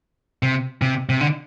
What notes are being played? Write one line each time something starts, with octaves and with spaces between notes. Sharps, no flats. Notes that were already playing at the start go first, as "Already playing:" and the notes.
C3
C3
C3
D3